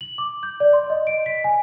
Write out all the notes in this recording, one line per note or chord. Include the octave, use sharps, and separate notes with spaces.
F#7
D6
G6
D5
C6
D#5
D7
B6
G#5